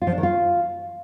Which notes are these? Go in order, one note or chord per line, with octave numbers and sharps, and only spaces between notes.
F4
F3
D4
D#3
F4